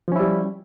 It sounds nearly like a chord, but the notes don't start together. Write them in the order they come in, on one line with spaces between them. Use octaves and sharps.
F3 C#4 E4 G3